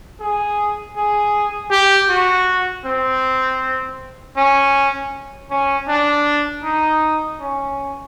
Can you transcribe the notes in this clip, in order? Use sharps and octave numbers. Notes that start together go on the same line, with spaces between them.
G#4
G#4
G4
F#4
C4
C#4
C#4
D4
D#4
C#4